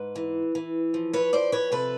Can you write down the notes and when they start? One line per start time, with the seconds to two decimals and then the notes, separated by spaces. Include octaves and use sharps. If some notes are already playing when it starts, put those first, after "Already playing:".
Already playing: G#2 B4
0.16 E3
0.55 E3
0.94 F3
1.13 B4 C#5
1.33 F3 C5 D5
1.52 B4 C#5
1.72 C3 A4 B4